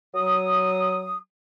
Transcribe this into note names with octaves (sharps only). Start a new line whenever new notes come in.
F#3 D#6